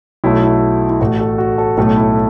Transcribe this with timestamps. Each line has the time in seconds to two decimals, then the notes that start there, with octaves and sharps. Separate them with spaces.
0.24 B1 B2 A3 E4
0.43 E4
0.90 E4
1.00 A1 A2 A3 F#4
1.20 A4
1.38 F#4
1.58 A4
1.78 B1 A2 A3 A4
1.97 E4